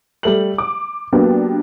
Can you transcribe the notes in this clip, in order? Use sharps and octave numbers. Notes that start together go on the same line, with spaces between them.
G3 A3 F#7
D6
F#3 A#3 B3 D4 G4